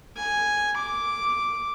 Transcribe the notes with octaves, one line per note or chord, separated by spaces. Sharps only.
G#5
D6